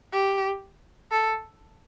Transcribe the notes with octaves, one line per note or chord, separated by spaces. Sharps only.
G4
A4